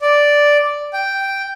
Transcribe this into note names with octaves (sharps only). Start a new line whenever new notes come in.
D5
G5